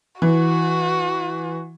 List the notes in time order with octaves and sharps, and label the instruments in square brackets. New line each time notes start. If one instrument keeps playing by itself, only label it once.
[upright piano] E3 [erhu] F#4